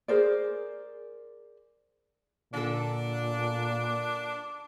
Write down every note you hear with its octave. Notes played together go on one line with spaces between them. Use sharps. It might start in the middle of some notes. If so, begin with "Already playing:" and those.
G#4 A#4 C5 D5
A#2 D3 D4 A4